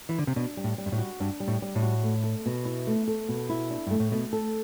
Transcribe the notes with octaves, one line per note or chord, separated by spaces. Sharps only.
E3
D3
C3
B2 D4
G3
A2
G3
G2
A2
F#4
G2 D4
G3
A2
G3
A2
F#4
A3
A4
B2
E4
A3
A4
B2
E4
D4
G2 A3
A2
B2 A3
A4